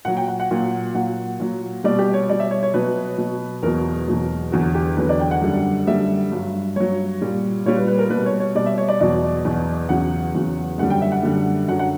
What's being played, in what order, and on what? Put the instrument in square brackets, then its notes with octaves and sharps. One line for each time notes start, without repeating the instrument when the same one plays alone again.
[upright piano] A#2 F#3 F#5
G5
F#5
F#5
A#2 F#3
A#2 F#3 F#5
A#2 F#3
B2 G3 D5
G4
C#5
B2 G3 D5
E5
C#5
C#5
B2 F#3 B4
B2 F#3
E2 B2 F#3 A#4
E2 B2 F#3
E2 D3 F#3 F#4
G4
E2 D3 F#3 B4
D5
G5
F#5
F#2 D3 G3
F#2 D3 G3 E5
G2 F#3
G2 F#3 C#5
A#2 G3
A#2 G3 C#5
B4
B4
A#4
B2 G3 B4
C#5
C#5
B2 G3 D5
E5
C#5
D5
E2 B2 F#3 D5
E2 B2 F#3
E2 C#3 F#3 F#5
E2 C#3 F#3
F#2 D3 G3 F#5
G5
E5
F#5
F#2 D3 G3
F#2 D3 F#3 F#5
F#5